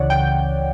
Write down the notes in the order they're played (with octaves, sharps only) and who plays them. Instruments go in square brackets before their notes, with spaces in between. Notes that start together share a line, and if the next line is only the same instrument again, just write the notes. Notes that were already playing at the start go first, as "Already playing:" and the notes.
Already playing: [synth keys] C#2 C#3 E3 C#5 D5 F#5
G5